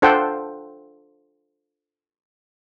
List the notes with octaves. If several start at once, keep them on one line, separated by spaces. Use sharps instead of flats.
D4 F4 A4 C5 F#5 G5